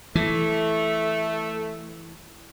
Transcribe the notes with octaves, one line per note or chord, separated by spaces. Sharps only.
E3 A3